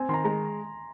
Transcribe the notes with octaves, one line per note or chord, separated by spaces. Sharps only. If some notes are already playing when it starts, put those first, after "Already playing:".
Already playing: C4 G#5
D#3 A#5 C6
G#3 A#5